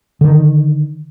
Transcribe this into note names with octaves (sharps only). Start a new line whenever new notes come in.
D3 D#3